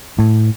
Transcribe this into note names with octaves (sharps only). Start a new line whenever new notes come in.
A2